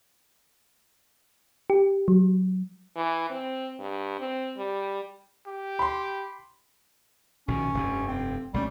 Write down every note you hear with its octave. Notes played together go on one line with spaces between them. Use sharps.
G4
F#3
E3
C4
G2
C4
G3
G4
B5 C6
A#1 B2 D#3 C#4
F1 G2
C4
B1 G3 A3 C#4